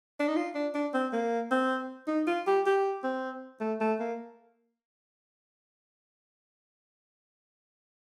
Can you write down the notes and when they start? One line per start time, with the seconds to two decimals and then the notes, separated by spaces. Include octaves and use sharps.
0.20 D4
0.28 D#4
0.36 F4
0.55 D4
0.74 D4
0.94 C4
1.13 A#3
1.51 C4
2.07 D#4
2.27 F4
2.47 G4
2.66 G4
3.04 C4
3.61 A3
3.81 A3
4.00 A#3